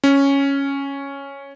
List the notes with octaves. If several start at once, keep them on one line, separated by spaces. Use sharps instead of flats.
C#4